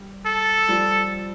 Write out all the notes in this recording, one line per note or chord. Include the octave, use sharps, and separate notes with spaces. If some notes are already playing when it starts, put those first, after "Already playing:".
Already playing: G3
A4
F3 G3